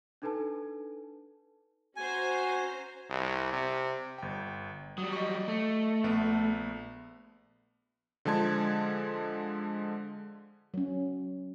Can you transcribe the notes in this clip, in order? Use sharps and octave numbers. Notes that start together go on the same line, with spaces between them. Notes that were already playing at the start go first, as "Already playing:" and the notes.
D4 D#4 A4 B4 G#5 A5
C#4 F#4 C5 G#5 A#5
C2
C3
G1 G5
F#3 G3 D#6
D#5 C#6
A3
A#1 B3
D3 F3 G#3 A5 G#6
F#3 C#4